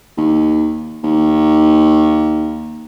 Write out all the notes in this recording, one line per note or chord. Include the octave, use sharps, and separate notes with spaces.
D#2
D#2